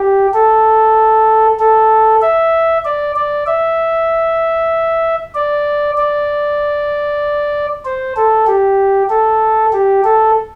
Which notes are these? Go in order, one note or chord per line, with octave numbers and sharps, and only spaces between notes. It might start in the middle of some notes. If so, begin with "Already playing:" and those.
Already playing: G4
A4
A4
E5
D5
D5
E5
D5
D5
C5
A4
G4
A4
G4
A4